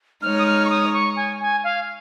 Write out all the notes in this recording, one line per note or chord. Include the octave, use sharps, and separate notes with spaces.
G#3 D#4 C#5 F6
D#6
F6
C#6
D#6
C#6
G#5
G#5
F5